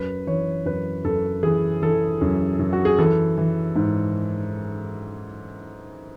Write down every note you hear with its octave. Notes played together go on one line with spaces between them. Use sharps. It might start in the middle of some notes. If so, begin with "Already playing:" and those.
Already playing: F#2 B4
E3 C#5
F#2 B4
F#2 A4
E3 G#4
E3 A4
F#2
F#2
F#4
G#4
E3 A4
E3
G#2